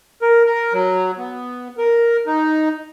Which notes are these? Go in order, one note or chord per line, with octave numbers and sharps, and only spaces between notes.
A#4
A#4
F#3
B3
A#4
D#4